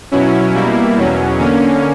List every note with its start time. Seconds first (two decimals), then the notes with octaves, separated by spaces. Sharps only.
0.11 B2 F#3 C#4 E4
0.54 B2 G3 A#3 E4
0.97 E2 B2 F#3 C#4
1.40 D3 A#3 C#4